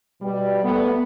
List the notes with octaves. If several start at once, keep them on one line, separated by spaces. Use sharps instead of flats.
B2 G3
A3 B3